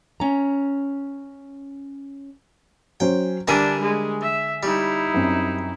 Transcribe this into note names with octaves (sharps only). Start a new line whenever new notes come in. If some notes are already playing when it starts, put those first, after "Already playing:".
C#4 A#5
F#3 C#4 C5 G5
D3 G3 D4 A#4 E5 G#5 D#7
G#3
E5
G3 D#4 E4
F#2 C4